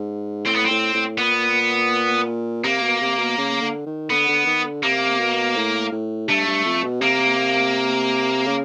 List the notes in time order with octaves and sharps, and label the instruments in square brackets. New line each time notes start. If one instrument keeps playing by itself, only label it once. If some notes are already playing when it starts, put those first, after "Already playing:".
Already playing: [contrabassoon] G#2
[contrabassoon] A2 [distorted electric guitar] C4
[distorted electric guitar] B3
C4
[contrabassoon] A2
A2
[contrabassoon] A#2 [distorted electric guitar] B3
[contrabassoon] C3 [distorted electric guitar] A#3
[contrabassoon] B2
C3
B2
C#3
D3
D#3
[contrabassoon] D3 [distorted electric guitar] B3
[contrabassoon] D3
D#3
D3
[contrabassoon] C3 [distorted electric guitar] A#3
[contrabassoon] B2
A2
A2
[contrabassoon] G2 [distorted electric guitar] A3
[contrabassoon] G2
F2
B2
[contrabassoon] C3 [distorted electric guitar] A#3
[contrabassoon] C#3